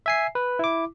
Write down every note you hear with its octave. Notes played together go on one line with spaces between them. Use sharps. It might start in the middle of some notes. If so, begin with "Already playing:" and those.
E5 G#5 C7
B4
E4 D6